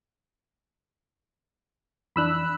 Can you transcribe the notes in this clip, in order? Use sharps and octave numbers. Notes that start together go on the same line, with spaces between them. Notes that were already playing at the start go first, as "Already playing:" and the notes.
F2 E3 D4 B5 E6 F#6